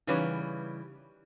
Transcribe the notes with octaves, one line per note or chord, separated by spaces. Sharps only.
C#3 E3 G3 D#4 B4 C#5